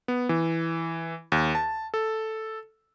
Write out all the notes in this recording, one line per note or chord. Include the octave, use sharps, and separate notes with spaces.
B3
E3
D#2
A5
A4